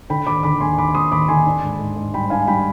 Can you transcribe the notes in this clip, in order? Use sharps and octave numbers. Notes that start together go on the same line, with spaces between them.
D3 G5 B5
D#2 B5 D6
D3 B5 D6
D#2 G#5 C6
D#2 B5 D6
D#2 C6 D#6
D#2 B5 D6
D3 G#5 C6
D4
G#2
G#2
G#2
G3 G5 B5
D4 F5 G#5
G3 G5 B5